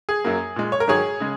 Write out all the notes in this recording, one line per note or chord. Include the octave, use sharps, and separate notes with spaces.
G#4
F#2 F#3 A#3
A#2 G#3
C#5
A#4
G#2 D#3 F#3 G#4 C#5
C#3 G#3